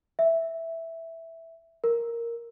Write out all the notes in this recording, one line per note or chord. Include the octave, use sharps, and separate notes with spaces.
E5
A#4